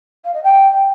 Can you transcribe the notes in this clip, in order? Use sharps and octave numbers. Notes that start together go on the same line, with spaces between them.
F5
D#5
G5